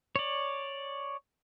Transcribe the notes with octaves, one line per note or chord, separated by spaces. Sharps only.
C#5 D5